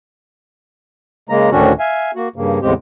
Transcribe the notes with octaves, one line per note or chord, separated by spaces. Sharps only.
C#3 G#3 A#3 A#5
D2 A2 D#3 C#4 D4 F#4
E5 F5 G#5
A#3 F#4
G2 C#3 A#3
E2 A2 C#3 G#3 C4 G4